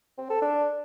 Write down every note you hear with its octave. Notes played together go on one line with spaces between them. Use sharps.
C4
A4
D4